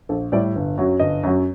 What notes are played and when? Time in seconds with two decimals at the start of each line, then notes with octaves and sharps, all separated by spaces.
0.09 A#1 A4
0.32 A2 G3 D5
0.55 G1
0.77 F#2 F#3
1.00 G1 D#5
1.23 F#2 F#3